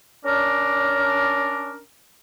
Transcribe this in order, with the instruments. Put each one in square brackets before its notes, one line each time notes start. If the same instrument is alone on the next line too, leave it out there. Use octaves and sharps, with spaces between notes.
[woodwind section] C#4 D4 A#4